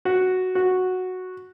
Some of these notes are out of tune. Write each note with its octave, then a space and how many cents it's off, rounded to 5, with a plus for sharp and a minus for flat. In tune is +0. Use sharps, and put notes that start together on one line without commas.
F#4 +0
F#4 -5